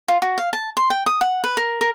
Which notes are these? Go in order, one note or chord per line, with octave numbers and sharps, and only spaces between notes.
F4
F#4
F5
A5
C6
G5
D#6
F#5
B4
A#4
A#4